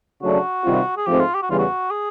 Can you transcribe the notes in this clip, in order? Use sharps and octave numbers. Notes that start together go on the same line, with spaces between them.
C#3 F#3 A3 D4 F#4
C3 D#3 G3 C4 F4
G#4
G#2 F3 A3 C4 G4
F4
G4
F#4
E2 C#3 E3 G3 F4
F#4
G#4